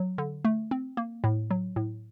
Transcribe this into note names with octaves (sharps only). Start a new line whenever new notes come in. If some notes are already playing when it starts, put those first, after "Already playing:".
Already playing: F#3
D3
A3
C4
A#3
A2
F#3
A2